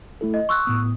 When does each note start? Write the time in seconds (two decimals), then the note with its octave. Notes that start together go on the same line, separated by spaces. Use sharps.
0.21 A3 E4 A4
0.34 D#5
0.49 C6 C#6 E6 F#6
0.65 A2 B3 D#6